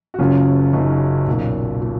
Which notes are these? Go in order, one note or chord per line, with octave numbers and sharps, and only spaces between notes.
F#4
F#1 F#2 C#3 C#4 F4
F#1 F#2 C#3 D#4
B1 A#2
A#2